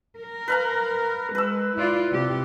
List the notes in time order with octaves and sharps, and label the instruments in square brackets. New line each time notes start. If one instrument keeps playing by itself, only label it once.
[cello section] A#4
[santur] B4 F5 A#5
[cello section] G#3 [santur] B4 E6
[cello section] E4 F4 D5
C3 G4